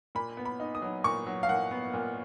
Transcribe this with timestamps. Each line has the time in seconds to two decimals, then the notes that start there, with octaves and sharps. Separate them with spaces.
0.15 A#2 B5
0.37 B3
0.45 B5
0.60 D#4
0.75 D#6
0.82 F#3
1.04 A#2 C#6
1.26 F#3
1.43 F5
1.49 A#2 F#5
1.71 B3
1.94 A#2